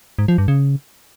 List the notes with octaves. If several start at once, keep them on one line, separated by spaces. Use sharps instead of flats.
G#2
F3
G2
C#3